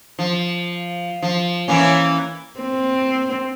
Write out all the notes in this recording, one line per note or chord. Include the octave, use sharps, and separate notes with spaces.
F3
F3
E3 A#3 C#4
C4